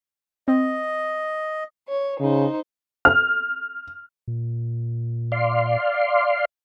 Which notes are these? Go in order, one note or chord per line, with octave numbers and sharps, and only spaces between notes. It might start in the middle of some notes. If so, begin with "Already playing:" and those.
C4 D#5
C#5
C#3 D#4 C5
F6
A#2
D5 F5 C6